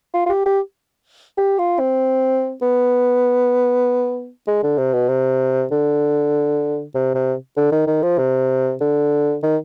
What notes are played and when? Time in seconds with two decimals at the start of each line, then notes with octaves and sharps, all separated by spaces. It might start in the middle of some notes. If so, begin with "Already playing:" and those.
0.14 F4
0.26 F4
0.30 G4
0.46 G4
1.38 G4
1.59 F4
1.79 C4
2.62 B3
4.47 G#3
4.63 D3
4.78 C3
4.94 B2
5.09 C3
5.71 D3
6.95 C3
7.15 C3
7.57 D3
7.72 D#3
7.87 D#3
8.03 F3
8.18 C3
8.81 D3
9.43 D#3